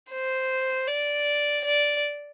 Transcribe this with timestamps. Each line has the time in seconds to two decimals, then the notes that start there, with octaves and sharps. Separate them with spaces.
0.11 C5
0.88 D5
1.65 D5